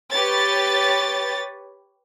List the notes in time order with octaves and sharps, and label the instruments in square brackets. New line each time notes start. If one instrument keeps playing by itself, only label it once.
[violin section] G4 B4 C#5 A6